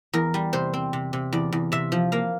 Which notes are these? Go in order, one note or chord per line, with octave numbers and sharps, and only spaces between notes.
E2 A#4
G3
C3 C5
C4
C3
C3
E2 D5
E2
C3 E5
F3
A#3 F5